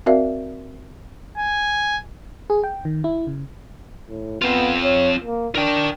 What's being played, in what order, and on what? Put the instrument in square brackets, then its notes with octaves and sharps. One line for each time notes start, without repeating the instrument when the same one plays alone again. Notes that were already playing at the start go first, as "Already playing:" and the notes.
[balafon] C4 F#4 A#4 D5 E5 F5
[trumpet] G#5
[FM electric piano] G#4
G5
D#3
E4
C#3
[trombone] A2
[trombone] B3 [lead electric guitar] C4 F4
[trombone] C#5
A#3
[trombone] D4 [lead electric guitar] A#4 G5